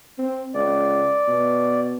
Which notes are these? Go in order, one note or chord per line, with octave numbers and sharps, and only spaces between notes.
C4
C#2 D5
B2